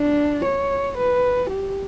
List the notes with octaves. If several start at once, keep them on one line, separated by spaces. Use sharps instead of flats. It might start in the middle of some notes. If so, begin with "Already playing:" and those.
Already playing: D4
C#5
B4
G4